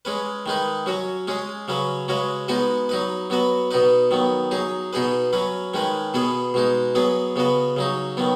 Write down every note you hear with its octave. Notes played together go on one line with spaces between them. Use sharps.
G#3 C#4 B4
D#3 G#3 D#4 B4
F#3 C#4 F#4
G#3 C#4 G#4
C#3 F#3 C#4 B4
C#3 G#3 C#4 F#4 B4
G#3 B3 D#4 F#4 B4
F#3 D#4 B4
F#3 B3 F#4 B4
B2 B3 D#4 B4
D#3 F#3 B3
F#3 D#4 G#4
B2 B3 D#4 G#4 B4
F#3 C#4 B4
D#3 G#3 C#4 B4
B2 B3 G#4 B4
B2 G#3 D#4
F#3 B3 G#4 B4
C#3 B3 F#4 B4
C#3 F#3 D#4
D#3 F#3 B3